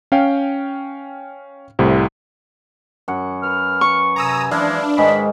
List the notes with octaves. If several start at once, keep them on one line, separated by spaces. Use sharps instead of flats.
C#4 F5 G5
C2 A2 C3
F#2 F#5
B4 F6
C#6
C3 G#5 A#5 D#6 E6
E3 F3 G#3 D4 E4 E5 F5
G#2 D#3 G#3 B5